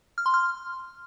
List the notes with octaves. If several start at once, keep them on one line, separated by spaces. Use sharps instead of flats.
F6
C6
F6